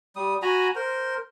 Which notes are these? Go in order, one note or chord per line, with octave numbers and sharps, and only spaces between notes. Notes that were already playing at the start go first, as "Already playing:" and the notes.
G3 D#6
F#4 G#5 A#5 B5
A#4 C5